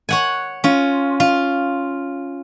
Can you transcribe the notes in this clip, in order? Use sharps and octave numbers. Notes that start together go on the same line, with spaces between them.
C#5 F#5 G#5
C#4 F4
F4